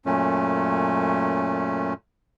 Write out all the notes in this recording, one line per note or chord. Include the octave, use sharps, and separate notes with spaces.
F#2 A#2 A3 C#4